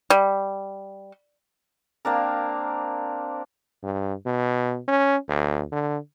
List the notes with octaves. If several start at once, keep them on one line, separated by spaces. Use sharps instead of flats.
G3
A#3 C4 D4 A#4
G2
B2
C#4
D2
D3